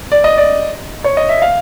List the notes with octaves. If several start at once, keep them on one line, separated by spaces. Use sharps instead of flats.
D5
D#5
D5
C#5
D#5
E5
F5